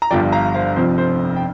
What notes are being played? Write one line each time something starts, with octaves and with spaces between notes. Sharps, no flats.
A#5
G1 G2 F3 D5 G5
F5 A#5
C5 F5
F1 F2 F3 C5
C5
G5